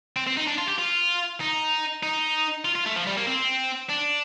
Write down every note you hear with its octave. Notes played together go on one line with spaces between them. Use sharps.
C4
C4
D#4
D4
F4
G4
F4
D#4
D#4
F4
F4
A3
F3
G3
A#3
C4
D4